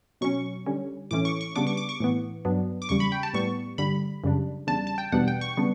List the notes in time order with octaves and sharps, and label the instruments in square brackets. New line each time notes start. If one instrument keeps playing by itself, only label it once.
[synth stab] B2 F#3 C#4 C#6
D3 G3 C#4
A2 E3 A3 C#4 D6
C#6
C#6
C#3 G3 B3 D4 D6
C#6
D6
C#6
A2 E3 B3
G2 F#3 B3 D4
D6
E2 C#3 G3 C#6
B5
G5
A5
A2 G3 B3 C#6
G2 D3 G3 B5
F#2 C#3 G3 D4
E2 C#3 G3 D4 A5
A5
G5
E2 B2 G3 B3 D4 F#5
G5
C#6
C#3 G3 B3 D4